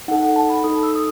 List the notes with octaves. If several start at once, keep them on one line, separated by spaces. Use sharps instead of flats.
D#4 A4 F#5
F#5
A5
B5
D#4 A4 D#6
E6
D#6